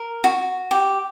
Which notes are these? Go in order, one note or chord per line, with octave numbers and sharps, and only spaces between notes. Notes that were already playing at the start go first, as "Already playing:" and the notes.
Already playing: A#4
F#4
G4